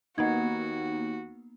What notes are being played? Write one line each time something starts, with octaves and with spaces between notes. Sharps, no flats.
D#2 A#3 B3 D#4 F#4 D#5 F#5 G#6